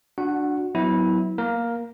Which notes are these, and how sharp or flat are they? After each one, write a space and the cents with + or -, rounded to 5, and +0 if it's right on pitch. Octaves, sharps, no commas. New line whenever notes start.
D4 +0 F#4 -25 F#5 +5
F#3 +5 B3 +15 E4 -20
A#3 +5 A#4 +10